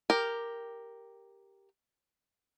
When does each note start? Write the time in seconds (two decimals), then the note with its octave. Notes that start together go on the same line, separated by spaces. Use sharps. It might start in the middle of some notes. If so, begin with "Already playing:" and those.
0.10 G4 A#4